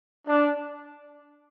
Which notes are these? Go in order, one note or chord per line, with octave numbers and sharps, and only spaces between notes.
D4